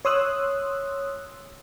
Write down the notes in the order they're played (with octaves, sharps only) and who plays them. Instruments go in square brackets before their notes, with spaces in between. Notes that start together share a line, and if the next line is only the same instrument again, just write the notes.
[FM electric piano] C#5 C6 D#6 E6 F#6